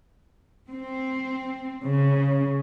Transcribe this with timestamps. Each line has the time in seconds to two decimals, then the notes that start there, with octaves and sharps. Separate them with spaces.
0.71 C4
1.85 C#3